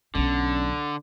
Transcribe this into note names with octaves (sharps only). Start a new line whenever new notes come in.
B1 D3 F#3 C#4